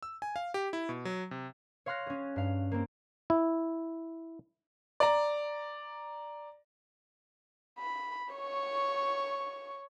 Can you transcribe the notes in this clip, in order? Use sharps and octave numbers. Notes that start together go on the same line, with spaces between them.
E6
G#5
F5
G4
E4
B2
F#3
C3
C#5 F5 C6 F6 F#6 A#6
C#4 G#4
G2 F5
A#3 C4
E4
D5 A#5
B5
C#5 C#6